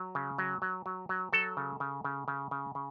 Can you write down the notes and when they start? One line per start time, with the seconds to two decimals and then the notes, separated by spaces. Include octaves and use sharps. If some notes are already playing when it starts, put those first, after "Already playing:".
Already playing: F#3
0.15 C#3
0.38 F#3
0.62 F#3
0.86 F#3
1.09 F#3
1.33 F#3 A4
1.57 C#3
1.80 C#3
2.05 C#3
2.28 C#3
2.51 C#3
2.75 C#3